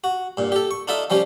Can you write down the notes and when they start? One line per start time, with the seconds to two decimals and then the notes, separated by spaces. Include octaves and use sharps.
0.04 F#4
0.37 G2 A#2
0.52 G4 A4
0.71 C#6
0.88 D4 D#4 F4 A4 E5
1.10 F3 G3 C#4 G4